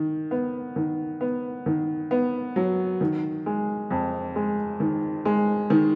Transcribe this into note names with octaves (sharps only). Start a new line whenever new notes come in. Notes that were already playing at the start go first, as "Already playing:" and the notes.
Already playing: D#3
B3
D#3
B3
D#3
B3
F#3
D#3
G#3
F2
G#3
D#3
G#3
D#3